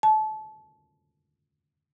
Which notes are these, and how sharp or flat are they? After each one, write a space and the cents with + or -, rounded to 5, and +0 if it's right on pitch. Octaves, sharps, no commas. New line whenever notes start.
A5 -30